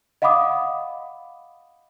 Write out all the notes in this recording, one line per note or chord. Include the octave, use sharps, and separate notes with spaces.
D#5 F5 F#5 B5 D6 D#6